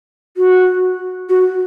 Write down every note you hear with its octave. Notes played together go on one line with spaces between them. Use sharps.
F#4
F#4